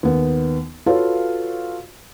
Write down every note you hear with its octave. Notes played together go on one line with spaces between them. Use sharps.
D#2 B3
F4 F#4 A4 B4 C#5 F5